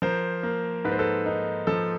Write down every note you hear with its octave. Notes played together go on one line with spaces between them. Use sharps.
F3 A#4 C5
A#3
G#2 B4
C5
A4 B4
D#4
F3 A4